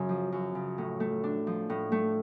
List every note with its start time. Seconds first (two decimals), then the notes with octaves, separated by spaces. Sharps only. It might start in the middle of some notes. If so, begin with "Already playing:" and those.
Already playing: F#2 C#3
0.09 F3
0.32 F#2
0.55 C#3
0.78 A2
1.00 A3
1.24 D4
1.47 F3
1.70 A2
1.92 A3